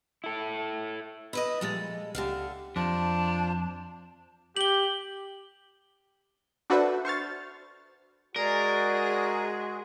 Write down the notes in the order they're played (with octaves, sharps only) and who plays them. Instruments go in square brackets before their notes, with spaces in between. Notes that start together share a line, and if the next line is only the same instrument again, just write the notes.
[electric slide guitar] E4 A4
[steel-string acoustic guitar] E4 B4 D#5
[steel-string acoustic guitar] A#2 G#3 A4 [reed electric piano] F3 G3 A6
[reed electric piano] C#2 G4 [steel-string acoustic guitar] D3 A3 F5
[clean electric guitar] F2 [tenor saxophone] D4 [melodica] F4 C5 [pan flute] A5
[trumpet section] G4 [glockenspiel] F#7 G7
[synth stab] D4 F#4 A4 B4 C5 E5
C5 C#6 F6 A6
[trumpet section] G#3 F#4 [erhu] G#4 [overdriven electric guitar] A#4 [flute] D5